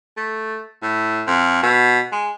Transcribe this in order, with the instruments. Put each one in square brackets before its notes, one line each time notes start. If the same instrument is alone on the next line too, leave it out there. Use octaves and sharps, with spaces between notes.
[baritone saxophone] A3
A2
F2
B2
G#3